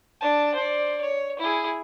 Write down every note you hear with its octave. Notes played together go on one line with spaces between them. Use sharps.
D4 A5
C5 D5
C#5
E4 G#4